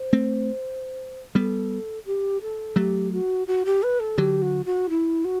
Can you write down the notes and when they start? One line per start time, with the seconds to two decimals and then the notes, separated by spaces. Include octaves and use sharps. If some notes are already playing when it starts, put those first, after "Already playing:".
Already playing: C5
0.13 A3 C4
1.35 G3 B3 A4
2.06 G4
2.42 A4
2.76 F#3 A3 G4
3.12 F#4
3.47 F#4
3.65 G4
3.83 B4
4.00 A4
4.18 D3 F#3 G4
4.42 F#4
4.66 F#4
4.89 E4
5.25 F#4